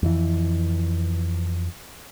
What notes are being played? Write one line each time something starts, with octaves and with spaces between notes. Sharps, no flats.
F2 E3